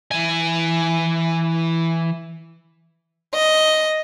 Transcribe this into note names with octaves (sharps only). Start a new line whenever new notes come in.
E3 G#5
D#5